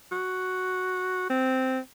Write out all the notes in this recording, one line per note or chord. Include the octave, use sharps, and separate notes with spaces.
F#4
C4